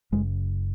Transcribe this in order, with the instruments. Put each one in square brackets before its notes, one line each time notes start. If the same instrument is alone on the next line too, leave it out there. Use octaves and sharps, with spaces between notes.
[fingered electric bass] F#1 F#2 C#3 G#3